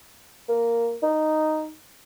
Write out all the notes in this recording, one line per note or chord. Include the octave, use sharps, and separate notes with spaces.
A#3
D#4